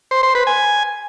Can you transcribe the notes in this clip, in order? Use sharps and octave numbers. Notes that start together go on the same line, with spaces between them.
C5
C5
B4
G#5